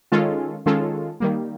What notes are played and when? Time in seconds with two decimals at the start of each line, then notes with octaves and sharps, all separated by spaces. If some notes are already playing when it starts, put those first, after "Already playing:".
0.12 D#3 G#3 C#4 F4 A4
0.66 D#3 G#3 C#4 F4 A4
1.20 D#3 G3 A#3